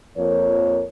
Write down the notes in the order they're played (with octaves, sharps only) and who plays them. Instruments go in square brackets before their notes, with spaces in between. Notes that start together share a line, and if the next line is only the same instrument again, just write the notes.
[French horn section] F2 F3 A#3 A#4 C#5